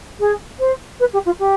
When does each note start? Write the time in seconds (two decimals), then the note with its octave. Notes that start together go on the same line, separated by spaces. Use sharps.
0.20 G#4
0.60 C5
1.00 B4
1.13 G4
1.26 F4
1.39 G4